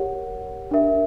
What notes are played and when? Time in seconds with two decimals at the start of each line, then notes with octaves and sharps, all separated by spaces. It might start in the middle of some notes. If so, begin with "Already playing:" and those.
Already playing: G4 A#4 C#5 F#5
0.71 D4 A#4 E5